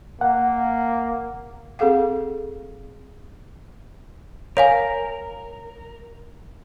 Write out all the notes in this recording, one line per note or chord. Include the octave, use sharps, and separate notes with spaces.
A#3 F#5
C4 G#4 A4 F5 F#5
A#4 C#5 F5 G#5